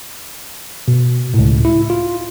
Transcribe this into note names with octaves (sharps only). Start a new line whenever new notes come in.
B2
C#2 A2
E4
F4